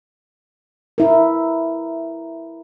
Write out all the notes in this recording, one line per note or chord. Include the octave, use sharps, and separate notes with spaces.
E4 A#4